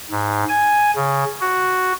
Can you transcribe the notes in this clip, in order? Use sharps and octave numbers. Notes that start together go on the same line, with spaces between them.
G#2
G#5
C#3
F#4